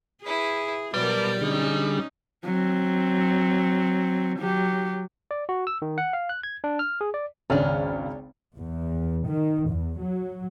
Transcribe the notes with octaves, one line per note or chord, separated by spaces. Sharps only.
E4 G#4 B4
B2 F#3 G3 A#4 B4 D5 A5 D6
D3 C#4 D#4 G#4
F#3 C4
F#3 G4
D5
F#4
E6
D#3
F#5
F5
F#6
G#6
D4
F6
G#4
D5
G#1 C#2 C#4 D4 F6
E2
D#3
E2
F#3